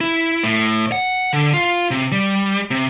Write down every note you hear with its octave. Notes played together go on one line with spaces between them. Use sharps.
E4
A2
F#5
D3
F4
C3
G3
C3